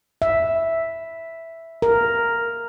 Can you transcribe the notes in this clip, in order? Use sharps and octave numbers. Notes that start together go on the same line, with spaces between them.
E5
A#4